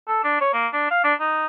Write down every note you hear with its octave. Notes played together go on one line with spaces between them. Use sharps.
A4
D4
C#5
A#3
D4
F5
D4
D#4